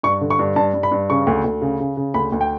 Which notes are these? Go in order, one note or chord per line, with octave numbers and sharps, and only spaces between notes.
G2 C#6
D3
C#6
G2
G2 A5
G2
B5
G2
C#3 C#6
D2
D2
C#3
C#3
C#3
D2 B5
D2
G5